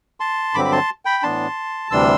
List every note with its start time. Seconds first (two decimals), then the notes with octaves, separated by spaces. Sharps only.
0.20 A5 C6
0.54 G2 D3 F#3 C4 B5 D6
0.65 B5
0.72 A5 C6
1.05 G5 B5
1.23 A2 E3 B3 D4 A5 C6
1.91 D2 C3 E3 G3 D4 C6 E6